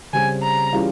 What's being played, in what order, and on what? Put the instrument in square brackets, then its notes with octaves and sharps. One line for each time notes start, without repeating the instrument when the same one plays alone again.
[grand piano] C#3 G3 C4 [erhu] G#5
[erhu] A#5
[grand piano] E3 G3 C#4 F4 G#4